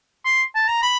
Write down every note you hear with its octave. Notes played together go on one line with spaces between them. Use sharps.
C6
A5
A#5
B5